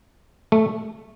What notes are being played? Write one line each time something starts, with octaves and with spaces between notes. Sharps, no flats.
A3